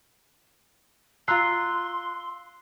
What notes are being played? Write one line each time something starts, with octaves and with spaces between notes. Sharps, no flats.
F4 A#5 C6 E6 F#6 C7